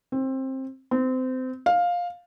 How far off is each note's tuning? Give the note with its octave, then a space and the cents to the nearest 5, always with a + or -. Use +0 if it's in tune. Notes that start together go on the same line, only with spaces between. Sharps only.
C4 +20
C4 -25
F5 +10